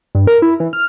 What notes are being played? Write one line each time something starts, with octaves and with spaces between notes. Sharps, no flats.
G2
A#4
E4
E3
F6